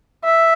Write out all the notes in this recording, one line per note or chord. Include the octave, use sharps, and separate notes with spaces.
E5